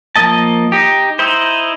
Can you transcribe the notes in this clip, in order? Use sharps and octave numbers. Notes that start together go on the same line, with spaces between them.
F3 A#3 D#5 A5
D#4 G4
D#4 E4 C5